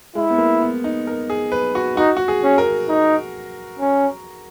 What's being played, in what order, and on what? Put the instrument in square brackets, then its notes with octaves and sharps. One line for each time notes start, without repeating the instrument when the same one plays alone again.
[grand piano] G#3 [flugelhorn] E4
[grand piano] B3
A#3
B3
D#4
A#4
G#4
B4
F#4
[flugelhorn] D#4 [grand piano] F#4
[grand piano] F#4
G#4
[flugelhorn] C#4
[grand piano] A#4
[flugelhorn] D#4
C#4